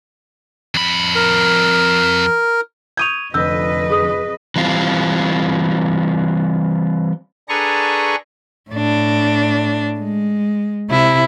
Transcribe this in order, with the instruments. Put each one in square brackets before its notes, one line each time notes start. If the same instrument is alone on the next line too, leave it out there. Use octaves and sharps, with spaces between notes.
[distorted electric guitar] F2 B5
[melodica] A#4
[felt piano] C#6 D#6 G6 [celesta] G#6 D#7 F7
[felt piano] F1 D3 G6 [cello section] F2 B4 D#5 [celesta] E6
[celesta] G#4 D#6
[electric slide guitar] E3 G3 C4 F4
[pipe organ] D4 G#4 A4 B4 A#5 C#6
[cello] A2 D4
G#3
C3 E4